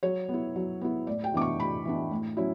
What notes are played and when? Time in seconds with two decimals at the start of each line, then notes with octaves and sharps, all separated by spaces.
0.03 F#3 C#5
0.29 B3
0.34 E4
0.56 F#3
0.81 B3 E4
1.07 A2 D5
1.24 G5
1.34 E3 B3 D4 D6
1.41 C#6
1.59 A2 B5
1.85 E3 B3 D4
2.11 A2
2.37 F#3 C#4 E4